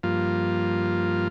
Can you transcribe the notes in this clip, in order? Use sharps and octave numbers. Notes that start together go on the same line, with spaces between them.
G2 F3 A#3 F4